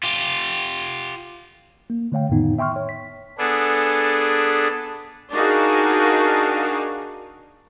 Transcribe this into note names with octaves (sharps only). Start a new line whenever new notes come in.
F4 G4
A#3
D3 A3 C#5 F5 G5
F2 A2 D3 D#3 B3 D#4
E5 G5 C6 C#6 F6
C#5
B6
B3 D4 G#4 A4
D4 D#4 F#4 G#4 A#4 F5